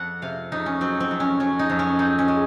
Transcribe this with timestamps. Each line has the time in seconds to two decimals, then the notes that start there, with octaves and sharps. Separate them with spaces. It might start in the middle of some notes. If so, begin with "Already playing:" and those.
Already playing: F2 F#5
0.22 C3 F5
0.52 F2 D#4
0.66 C#4
0.81 F#3 C4
1.00 C4
1.11 F2
1.20 C#4
1.39 F#3 C#4
1.59 D#4
1.70 F2
1.79 C#4
1.99 C4 D#4
2.19 C#4
2.28 G#3